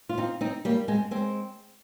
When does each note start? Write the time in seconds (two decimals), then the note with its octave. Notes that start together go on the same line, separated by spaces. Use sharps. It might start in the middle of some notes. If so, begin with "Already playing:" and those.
0.09 F4
0.18 C4 D#4
0.41 C4 D#4
0.65 G3 A#3
0.88 G#3 C4
1.11 G#3 C4